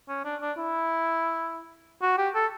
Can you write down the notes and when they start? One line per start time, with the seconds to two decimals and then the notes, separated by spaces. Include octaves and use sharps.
0.08 C#4
0.25 D4
0.41 D4
0.57 E4
2.02 F#4
2.18 G4
2.35 A4